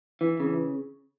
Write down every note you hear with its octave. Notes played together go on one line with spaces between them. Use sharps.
E3
C#3